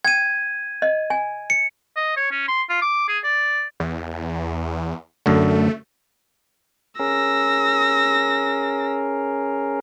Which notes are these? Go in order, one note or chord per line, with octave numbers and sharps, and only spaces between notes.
G5 G#6 D#7
D#5
G#5
C#7
D#5
C#5
C#4
C6
F4
D6
G#4
D5
E2
F#2 D3 A3
C#4 G#4 A#4 E6 A#6